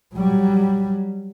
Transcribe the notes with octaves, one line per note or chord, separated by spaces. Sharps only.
F#3 G3